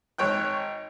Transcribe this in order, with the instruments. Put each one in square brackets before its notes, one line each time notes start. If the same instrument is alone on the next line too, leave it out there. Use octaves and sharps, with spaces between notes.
[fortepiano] G#1 C#5 G5 F#6